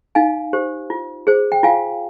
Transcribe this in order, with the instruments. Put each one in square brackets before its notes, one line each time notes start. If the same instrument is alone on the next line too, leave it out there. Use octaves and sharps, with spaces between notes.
[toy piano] D#4 F5 G#5
G4 C5
F4
G#4 C5
G5
F4 F5 G#5